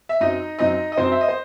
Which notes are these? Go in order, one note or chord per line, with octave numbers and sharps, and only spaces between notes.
E5
F#2 F#3 C4 D#4 D#5
F#2 F#3 C4 D#4 D#5
D#5
F#2 F#3 C4 C5
E5
D#5
C5